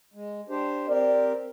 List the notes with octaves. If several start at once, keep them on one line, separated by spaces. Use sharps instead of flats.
G#3
D4 G4 C5
C4 G4 A#4 D5